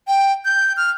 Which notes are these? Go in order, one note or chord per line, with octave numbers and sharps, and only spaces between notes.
G5
G6
F6